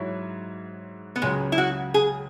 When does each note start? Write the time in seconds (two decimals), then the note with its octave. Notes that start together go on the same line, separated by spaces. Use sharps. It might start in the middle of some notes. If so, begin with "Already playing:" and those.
Already playing: G#2 F#3 E4 C#5
1.16 B3
1.22 C#2 C#3 F#3 G#3 C#4
1.52 E4
1.58 F#4
1.94 G#4